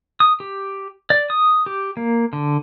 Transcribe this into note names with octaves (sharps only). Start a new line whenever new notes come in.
D#6
G4
D5
D#6
G4
A#3
D3